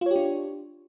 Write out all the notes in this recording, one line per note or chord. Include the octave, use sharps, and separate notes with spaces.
D4 F4 G4 C#5